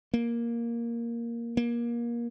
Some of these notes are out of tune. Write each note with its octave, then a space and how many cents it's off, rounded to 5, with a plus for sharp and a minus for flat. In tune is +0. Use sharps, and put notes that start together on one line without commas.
A#3 +5
A#3 +25